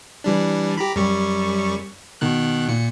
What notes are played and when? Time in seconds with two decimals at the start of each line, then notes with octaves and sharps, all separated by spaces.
0.24 E3 G3 D4
0.78 G4 A#5 B5
0.96 F#2 G3 C#6
2.21 B2 D#3 F#6
2.68 A#2 C#7